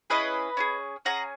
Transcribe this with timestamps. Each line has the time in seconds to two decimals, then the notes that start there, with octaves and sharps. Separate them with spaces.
0.10 C#4 E4 G#4 B4 D#5
0.57 C#4 E4 G#4
1.05 C#4 G#4 F#5 A#5